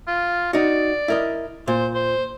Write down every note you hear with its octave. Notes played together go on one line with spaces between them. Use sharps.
F4
D#4 F#4 D5
E4 A#4 D#5
A#2 C5
C5